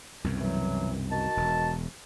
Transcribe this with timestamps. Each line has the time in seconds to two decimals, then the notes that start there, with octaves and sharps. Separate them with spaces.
0.24 C2 F#2 B2
0.40 E3 F#3
1.11 D#3 F#4 A5
1.37 E1